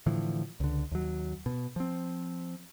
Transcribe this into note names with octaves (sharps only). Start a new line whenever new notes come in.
A2 D3 E3 F3
C#2 D3
D#2 F#3
B2
F3 C4